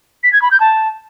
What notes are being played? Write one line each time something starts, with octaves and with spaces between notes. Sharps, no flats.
B6
G#6
B5
G6
A5